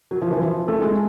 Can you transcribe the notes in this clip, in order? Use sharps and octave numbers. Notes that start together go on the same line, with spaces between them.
F#3
F3
E3
F3
A3
G#3